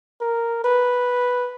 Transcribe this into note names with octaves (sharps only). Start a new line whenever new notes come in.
A#4
B4